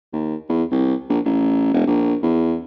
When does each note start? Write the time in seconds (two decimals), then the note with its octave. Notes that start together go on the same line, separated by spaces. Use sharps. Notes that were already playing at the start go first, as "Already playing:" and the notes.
0.13 D#2
0.49 E2
0.71 C2
1.10 A#1
1.25 A1
1.74 E1
1.87 A#1
2.23 E2